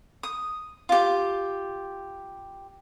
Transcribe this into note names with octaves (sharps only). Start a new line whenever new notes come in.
D#6
F4 G4